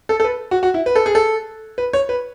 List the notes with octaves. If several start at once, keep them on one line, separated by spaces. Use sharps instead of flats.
A4
A4
B4
F#4
F#4
E4
B4
A4
G#4
A4
B4
C#5
B4